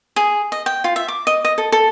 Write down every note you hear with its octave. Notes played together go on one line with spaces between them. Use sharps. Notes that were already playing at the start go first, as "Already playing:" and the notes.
G#4
D#5
G5
F4
E5
D6
D#5
D#5
A4
A4